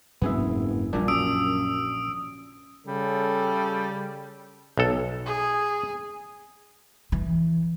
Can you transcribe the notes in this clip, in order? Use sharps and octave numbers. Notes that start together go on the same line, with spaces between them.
F#1 F2 G#2 B3 C4 G#4 E5
E1 A#1 A#2 G3 C#4 D4
F#2 C#4 D#6 E6 D7
C#3 G3 A4
B1 A4
G#4
E3